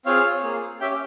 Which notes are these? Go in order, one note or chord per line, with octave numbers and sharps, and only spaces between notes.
C4 F4 G#4 C#5 F5
A#3 F4 G#4
C#4 G4 E5 G5